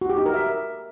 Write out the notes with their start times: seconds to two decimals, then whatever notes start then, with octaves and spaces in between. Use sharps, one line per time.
0.01 F#4
0.10 G4
0.18 D#4
0.26 A#4
0.34 E5